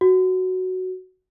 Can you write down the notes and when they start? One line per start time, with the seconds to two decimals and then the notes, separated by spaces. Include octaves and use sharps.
0.01 F#4